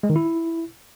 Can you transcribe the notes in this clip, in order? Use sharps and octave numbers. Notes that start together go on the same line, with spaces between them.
G#3
D#3
E4